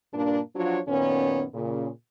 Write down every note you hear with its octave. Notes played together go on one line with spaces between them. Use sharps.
G2 A#2 A#3 D4
F3 F#3 D4 F4 F#4 C#5
F#2 A#2 D#3 B3 C#4
A#2 C#3